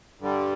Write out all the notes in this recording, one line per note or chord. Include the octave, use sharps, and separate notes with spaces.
G2 D3 G3